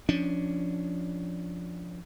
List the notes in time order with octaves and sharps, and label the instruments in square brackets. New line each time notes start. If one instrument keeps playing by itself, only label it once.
[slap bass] F3 C#4 D4